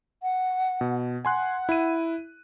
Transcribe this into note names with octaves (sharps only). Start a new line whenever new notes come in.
F#5
B2
F#5 G#5 C6 F#6
E4 D#7